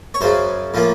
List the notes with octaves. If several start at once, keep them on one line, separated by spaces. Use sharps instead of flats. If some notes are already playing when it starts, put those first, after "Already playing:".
C#5
F#2 C#3 F#3 C5
A2 F3 A#3